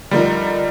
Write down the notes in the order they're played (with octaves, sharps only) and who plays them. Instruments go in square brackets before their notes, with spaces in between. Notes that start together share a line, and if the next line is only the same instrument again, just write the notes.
[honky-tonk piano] D3 F3 A3 D#4 A#4 [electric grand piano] G3